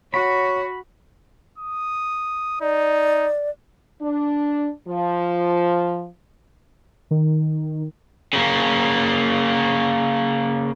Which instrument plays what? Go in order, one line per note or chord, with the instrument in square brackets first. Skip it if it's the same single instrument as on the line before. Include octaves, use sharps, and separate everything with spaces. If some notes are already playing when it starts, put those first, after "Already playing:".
[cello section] F#4 [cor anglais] C#5 [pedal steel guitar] B5
[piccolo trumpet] D#6
[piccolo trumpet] D#4 [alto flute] D5
[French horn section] D4
F3
[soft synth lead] D#3
[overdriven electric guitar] C#3 A#3